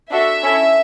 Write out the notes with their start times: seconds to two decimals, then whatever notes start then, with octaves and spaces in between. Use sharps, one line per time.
0.11 D4 F#4 A4 E5
0.42 C#4 E4 A4